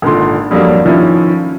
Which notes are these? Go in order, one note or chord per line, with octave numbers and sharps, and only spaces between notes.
G#1 A#2 D3 C6
F2 F#3 G3 A#3 D4
D#3 F3 C#4 E4